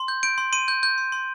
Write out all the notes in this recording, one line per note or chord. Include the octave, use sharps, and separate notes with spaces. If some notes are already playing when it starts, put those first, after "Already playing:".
Already playing: C6
G6
G6 D7
C6
C6 D#7
G6
G6
C6
C6